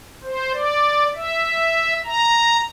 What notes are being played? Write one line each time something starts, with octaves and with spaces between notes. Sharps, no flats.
C5
D5
E5
A#5